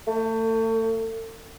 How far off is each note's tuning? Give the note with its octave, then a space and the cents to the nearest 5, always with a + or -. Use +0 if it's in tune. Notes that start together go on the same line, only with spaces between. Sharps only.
A3 +35